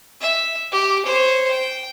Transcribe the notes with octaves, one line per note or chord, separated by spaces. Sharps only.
E5
G4
C5 C#5
G5